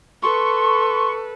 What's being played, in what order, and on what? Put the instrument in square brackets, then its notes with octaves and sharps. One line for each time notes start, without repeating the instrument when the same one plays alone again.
[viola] A4 B4 [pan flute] C6 [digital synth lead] C#6